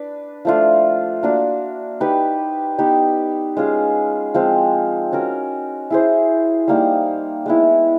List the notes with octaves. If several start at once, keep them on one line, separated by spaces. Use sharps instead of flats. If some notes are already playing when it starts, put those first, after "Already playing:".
Already playing: D4 B4
F3 A3 D4 F4
A#3 D4 F#4
D#4 G4 B4
B3 D#4 G4
G#3 C#4 F4 G#4
F3 G#3 C4
C#4 F#4 A#4
E4 G#4 C5
G3 A#3 D#4
G#3 B3 E4